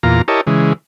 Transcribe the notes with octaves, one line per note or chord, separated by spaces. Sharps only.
E2 A#2 F4 A#5
E4 G4 A#4 C#5 D#5 A5
C#3 E3 G#3